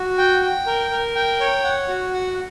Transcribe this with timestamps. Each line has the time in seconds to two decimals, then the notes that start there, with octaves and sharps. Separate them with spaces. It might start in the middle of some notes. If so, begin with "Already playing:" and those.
Already playing: F#4
0.18 G5
0.42 G5
0.66 A#4
0.91 A#4
1.15 G5
1.40 C#5
1.64 F#5
1.88 F#4
2.13 F#5